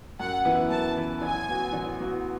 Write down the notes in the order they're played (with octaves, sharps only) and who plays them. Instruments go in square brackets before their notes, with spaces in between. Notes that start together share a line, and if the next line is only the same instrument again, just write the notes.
[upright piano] F#2 [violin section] F#5
[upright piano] E3 B3 E4 B4
[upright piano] F#2 [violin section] A5
[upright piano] E3 B3 E4 B4
[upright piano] A1 [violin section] G#5
[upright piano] A2 F#3 B3 F#4
A1
A2 F#3 B3 F#4